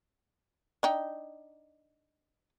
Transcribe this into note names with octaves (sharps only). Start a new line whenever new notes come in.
D4 D#4 G5